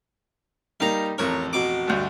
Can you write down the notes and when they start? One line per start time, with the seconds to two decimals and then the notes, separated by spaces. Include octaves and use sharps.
0.80 G3 A#3 D#4 F5 A#5
1.18 A1 F2 A#4 C#5
1.53 B2 D6
1.87 D2 G2